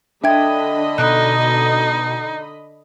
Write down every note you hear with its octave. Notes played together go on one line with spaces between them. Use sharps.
D3 D4 D#5 E5 G5 B5 G#6
B2 D#4 F#6